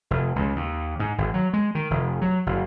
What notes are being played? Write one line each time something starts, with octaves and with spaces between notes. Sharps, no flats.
F1
C#2
D#2
G#2
G#1
F#3
G#3
D#3
F1
F#3
F#1